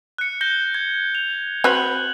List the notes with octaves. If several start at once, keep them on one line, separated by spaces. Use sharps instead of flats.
F#6 C#7
G6 A#6 G7
G#6
F7
C4 F#4 B4 F#6 F#7